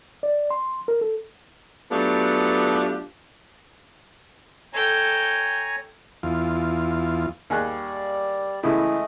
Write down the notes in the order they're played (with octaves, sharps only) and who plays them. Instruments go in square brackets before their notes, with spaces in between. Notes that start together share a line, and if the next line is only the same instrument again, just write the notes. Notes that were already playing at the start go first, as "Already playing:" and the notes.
[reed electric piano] D5
C6
A#4
A4
[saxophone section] F#3 A3 B3 D4 F4 G4
[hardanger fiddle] A4 G5 [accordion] C#5 G#5 A#5
[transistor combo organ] E2 F4
[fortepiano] D#2 G#4 F#6 [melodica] G3 D5
[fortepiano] A2 C#3 E3 [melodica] G#3 A3 D#5